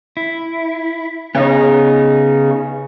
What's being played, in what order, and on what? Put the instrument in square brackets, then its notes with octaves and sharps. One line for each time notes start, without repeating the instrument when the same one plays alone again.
[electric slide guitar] E4
[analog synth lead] C#3 [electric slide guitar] B3 D#4